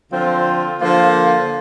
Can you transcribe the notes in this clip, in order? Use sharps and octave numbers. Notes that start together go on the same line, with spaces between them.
D3 F3 C4 F4
D3 F3 A#3 F4 C5